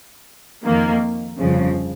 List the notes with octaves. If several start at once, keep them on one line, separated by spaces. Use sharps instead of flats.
F2 D#3 A#3
G1 F2 C#3 F3